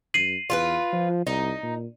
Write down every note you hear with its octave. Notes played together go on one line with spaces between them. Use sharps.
F#2 C7 D#7 F#7
E2 F4 G4 B4
F3
C2 D#4
A#2